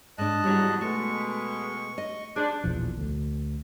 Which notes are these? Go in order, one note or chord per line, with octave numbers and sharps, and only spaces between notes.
G#2 D4 D#5 A5 F#6
E2 G#2 F#3 G3 F#4
B2 G#3 A3 C#6
D#5
D4 G#4 C5
A#1 E2 B2 F3
D2